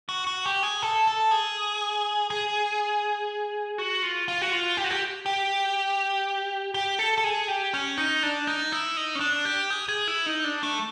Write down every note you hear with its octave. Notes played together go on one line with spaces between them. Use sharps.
F#4
F#4
G4
G#4
A4
A4
G#4
G#4
F#4
F4
F4
F#4
F4
G4
F#4
G4
G4
G4
A4
A4
G#4
G4
C#4
D#4
D4
D#4
E4
D#4
C#4
D4
G4
G#4
G#4
E4
D#4
D4
A3